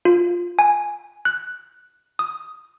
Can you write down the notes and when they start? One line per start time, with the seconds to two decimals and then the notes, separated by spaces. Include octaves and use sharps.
0.05 F4
0.59 G#5
1.25 F#6
2.19 D#6